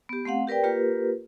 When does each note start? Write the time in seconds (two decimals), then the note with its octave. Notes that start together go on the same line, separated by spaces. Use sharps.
0.09 B3 G4
0.25 A3 C4 F5 F#5
0.47 G4 A#4 B4 D5 G5
0.63 A#3 F4 G4 A#4 B4